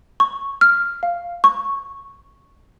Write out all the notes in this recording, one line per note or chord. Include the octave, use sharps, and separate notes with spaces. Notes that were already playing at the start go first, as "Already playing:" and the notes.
C#6
F6
F5
C#6